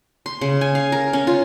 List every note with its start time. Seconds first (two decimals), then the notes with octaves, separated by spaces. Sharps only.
0.26 C6
0.41 C#3
0.61 G#5
0.75 F5
0.92 A#4
1.13 C#4
1.27 F4